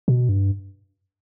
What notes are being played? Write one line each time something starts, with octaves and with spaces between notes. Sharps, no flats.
B2
G2